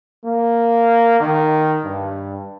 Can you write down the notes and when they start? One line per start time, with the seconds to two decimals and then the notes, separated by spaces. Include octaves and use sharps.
0.25 A#3
1.20 D#3
1.84 G2